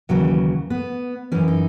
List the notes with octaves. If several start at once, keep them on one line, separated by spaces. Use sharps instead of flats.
D#2 C#3 E3 F#3
B3
F#2 E3 C#4
D#4